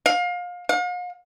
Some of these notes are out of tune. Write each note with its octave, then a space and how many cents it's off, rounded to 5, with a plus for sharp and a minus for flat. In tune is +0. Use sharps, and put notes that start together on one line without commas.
F5 +30
F5 +45